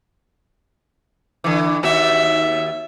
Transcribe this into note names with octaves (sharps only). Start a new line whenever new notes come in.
D3 E3
D#2 F#4 E5